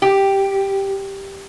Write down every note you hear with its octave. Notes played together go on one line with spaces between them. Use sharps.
G4